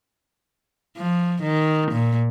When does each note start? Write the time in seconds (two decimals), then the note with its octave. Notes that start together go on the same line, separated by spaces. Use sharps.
0.97 F3
1.42 D#3
1.91 A#2